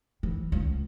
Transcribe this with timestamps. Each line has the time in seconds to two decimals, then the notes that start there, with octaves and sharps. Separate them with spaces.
0.23 E3
0.52 C#2